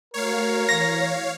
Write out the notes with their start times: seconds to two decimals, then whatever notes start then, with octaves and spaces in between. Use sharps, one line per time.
0.14 A3 F#4 A#4 C#5 F5
0.69 E3 A#6